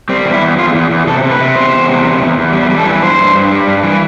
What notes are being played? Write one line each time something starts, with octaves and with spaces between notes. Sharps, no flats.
G3 C4
E2
E4
E2
E2 F4
E2
E2
C3 A4
C3
B4
C3
E2 C5
E2
C3
E2
E2
E2
G3
G3
A4
E3
G2 C5
G2
G2
G3
G2
E3